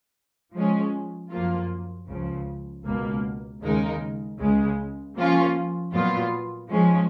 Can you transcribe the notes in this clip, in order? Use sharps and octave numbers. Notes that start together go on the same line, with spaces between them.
F3 G#3 C#4
F#2 F3 A#3 F4
C#2 C#3 F3
C#2 B2 A#3
D#2 C#3 G#3 D#4 A#4
C#2 C#3 G#3
F3 A#3 C#4 F4
A#2 F#3 B3 F4
G#2 F3 G#3 C#4